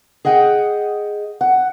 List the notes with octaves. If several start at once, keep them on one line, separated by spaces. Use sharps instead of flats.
G#4 D#5 F#5 G5
F#5